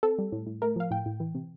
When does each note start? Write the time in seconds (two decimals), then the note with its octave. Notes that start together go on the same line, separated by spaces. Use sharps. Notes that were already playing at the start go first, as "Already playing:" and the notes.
0.03 C4 A4
0.18 G3
0.32 A2
0.47 A2
0.62 A3 A#4
0.76 F3 F5
0.91 A2 G5
1.06 A2
1.20 E3
1.35 C3